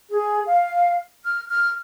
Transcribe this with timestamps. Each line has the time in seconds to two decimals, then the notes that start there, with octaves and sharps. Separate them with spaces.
0.09 G#4
0.46 F5
1.24 F6
1.49 F6